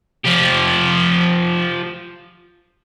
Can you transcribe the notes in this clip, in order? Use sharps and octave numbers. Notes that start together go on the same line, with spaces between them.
F3 G4